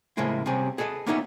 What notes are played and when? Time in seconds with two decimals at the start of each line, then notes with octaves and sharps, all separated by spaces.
0.17 A2 C#3 F3 G#3 A#3 E4
0.46 C3 G3 C4 C#4 G#4
0.78 G#4 A4 B4 D5 D#5
1.06 A#3 B3 C#4 D#4 F4 E5